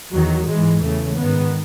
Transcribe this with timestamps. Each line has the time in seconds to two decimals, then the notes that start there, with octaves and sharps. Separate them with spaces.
0.11 E2 D#3 F#3
0.47 G#2 E3 G#3
0.81 E2 C#3 E3 A3
1.17 G#2 D#3 B3